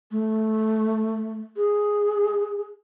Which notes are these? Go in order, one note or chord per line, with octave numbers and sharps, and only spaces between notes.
A3
G#4